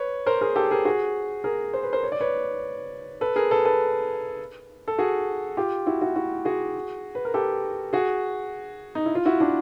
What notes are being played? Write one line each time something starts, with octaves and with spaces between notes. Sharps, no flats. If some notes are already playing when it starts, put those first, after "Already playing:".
Already playing: B4 C#5
A#4 C5
G#4 A#4
G4 A4
G#4 A#4
F#4 G#4
G#4 A#4
C5
B4
A#4 C5
C#5
D5
B4 C#5
A4 B4
G#4 A#4
A4 B4
A4 B4
A4
F#4 G#4
F4 G4
E4 F#4
E4 F#4
E4 F#4
F#4 G#4
B4
A#4
G4 A4
F#4 G#4
D#4
E4
F4
E4 F#4
D4 E4